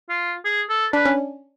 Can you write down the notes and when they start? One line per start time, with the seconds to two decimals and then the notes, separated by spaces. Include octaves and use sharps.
0.09 F4
0.45 G#4
0.69 A4
0.93 D4 B4
1.05 C#4